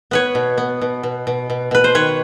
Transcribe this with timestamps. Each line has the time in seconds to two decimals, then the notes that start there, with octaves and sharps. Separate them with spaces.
0.11 B3 B4 C#5
0.35 B2
0.58 B3
0.81 B2
1.03 B2
1.27 B2
1.50 B2
1.71 B2 B4
1.84 C5
1.95 D#3 B4 C#5